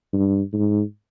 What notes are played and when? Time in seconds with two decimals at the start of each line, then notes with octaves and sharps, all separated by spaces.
0.13 G2
0.53 G#2